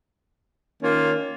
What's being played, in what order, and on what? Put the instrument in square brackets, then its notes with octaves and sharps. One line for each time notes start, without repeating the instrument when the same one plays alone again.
[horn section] D#3 A#3 C#4 F4